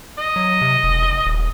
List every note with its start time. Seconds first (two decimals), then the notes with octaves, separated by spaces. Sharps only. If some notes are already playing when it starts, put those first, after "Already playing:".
0.18 D#5
0.36 F#3
0.62 C3
0.84 E1
1.02 F1
1.26 D#1